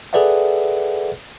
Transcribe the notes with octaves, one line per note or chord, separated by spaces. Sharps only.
G#4 A4 B4 D5 E5 F#5